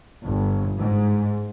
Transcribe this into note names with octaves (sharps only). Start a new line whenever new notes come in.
G1
G#2